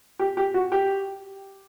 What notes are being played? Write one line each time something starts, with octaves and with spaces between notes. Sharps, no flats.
G4
G4
F#4
G4